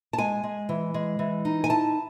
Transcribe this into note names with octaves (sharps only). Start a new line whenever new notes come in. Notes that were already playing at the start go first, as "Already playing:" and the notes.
A5
G#3 G#5
G#3
E3
G#3
E3
D#4
G#5
E4 A5